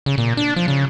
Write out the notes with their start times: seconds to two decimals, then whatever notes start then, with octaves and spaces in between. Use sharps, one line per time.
0.06 C#3
0.18 A#2
0.37 D4
0.56 F3
0.68 C#3